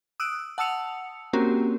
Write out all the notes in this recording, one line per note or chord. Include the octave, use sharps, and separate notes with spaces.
D#6 E6 F#6 D7
F#5 A5 D#6 E6 C#7 F7
A#3 C4 C#4 F#4 G4 A#4